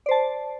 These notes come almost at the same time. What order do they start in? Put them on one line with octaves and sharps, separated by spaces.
D5 C5 A5